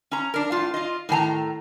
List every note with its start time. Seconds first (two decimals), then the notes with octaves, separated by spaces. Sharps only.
0.11 C#4 A#5
0.34 D4 A#4
0.51 A2 F4
0.74 F4 D#5
1.09 A2 D#3 G#5 A#5